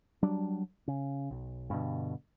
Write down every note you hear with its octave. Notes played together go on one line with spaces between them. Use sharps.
F#3 G3 D4
C#3
B1
G2 B2 D3